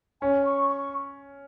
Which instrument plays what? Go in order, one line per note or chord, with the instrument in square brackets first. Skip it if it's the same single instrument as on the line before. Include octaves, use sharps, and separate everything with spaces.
[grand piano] C#4 [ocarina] G#5
[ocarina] C#6
C#6